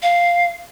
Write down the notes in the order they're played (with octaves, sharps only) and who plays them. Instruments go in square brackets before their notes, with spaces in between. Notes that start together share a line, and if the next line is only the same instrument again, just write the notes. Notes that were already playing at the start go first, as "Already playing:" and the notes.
[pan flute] F5